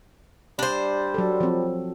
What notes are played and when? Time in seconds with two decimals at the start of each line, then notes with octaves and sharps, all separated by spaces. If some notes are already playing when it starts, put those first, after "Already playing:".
0.59 G3 D4 C5
1.14 F#3 A4
1.40 F3 C4